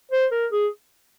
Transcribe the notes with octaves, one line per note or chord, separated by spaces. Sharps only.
C5
A#4
G#4